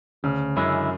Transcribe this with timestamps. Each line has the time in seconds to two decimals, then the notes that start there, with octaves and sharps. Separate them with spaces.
0.24 D2 C#3
0.56 F#2 D3 G#3 C#4 E4